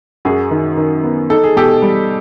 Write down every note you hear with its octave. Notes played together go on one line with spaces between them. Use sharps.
F#2 F#4 G#4
D#3
D#3
B3
D#4 A4
G#4
B2 G4 A4
G3